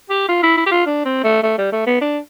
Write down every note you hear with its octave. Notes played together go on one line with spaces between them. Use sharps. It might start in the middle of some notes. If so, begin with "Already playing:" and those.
G4
F4
E4
E4
G4
F4
D4
C4
A3
A3
G3
A3
B3
D4